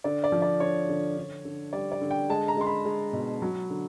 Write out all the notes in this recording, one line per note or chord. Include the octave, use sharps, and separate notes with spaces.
D3 D5
D5
F3
D5
D3 C#5
D3
D3
D3
G3 D5
D5
D3
G5
G#3 A5
A#5
G#3 C6
B5
G#3
B2
F#3
D3